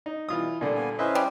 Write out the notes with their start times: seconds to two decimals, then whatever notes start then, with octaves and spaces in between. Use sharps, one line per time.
0.06 D#4
0.29 B2 E3 G3 F4 D#6
0.61 A#2 D3 G3 G#5
0.75 A#3 B3 G#5
0.99 C#4 E4 B4 C5 D#5 E5
1.15 G3